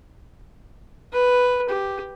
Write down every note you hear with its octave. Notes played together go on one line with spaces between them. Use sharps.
B4
G4